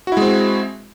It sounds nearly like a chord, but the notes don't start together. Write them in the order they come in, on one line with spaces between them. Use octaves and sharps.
F#4 E4 G#3 C4